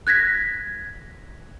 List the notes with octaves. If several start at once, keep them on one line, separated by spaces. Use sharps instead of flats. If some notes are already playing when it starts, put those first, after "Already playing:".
F#6 G#6 A#6 B6